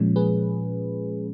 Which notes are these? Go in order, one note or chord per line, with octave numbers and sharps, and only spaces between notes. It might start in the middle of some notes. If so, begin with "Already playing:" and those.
Already playing: A#2 F3 G#3 C#4
G#4 B4